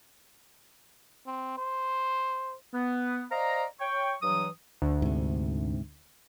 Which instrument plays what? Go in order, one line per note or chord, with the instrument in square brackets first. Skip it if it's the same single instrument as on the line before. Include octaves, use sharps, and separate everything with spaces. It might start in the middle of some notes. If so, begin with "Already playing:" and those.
[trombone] C4
C5
[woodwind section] B3
C5 D5 D#5 F5 A#5
C#5 G5 C#6
G2 E3 F#3 D#6
[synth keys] D2
[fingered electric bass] G#2 C3